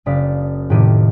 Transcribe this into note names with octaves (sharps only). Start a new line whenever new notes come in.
F#1 D5 F5 D#6 B6
F1 A2 D#3 G4 D#7